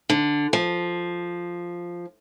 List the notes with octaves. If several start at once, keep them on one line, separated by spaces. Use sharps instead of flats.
D3
F3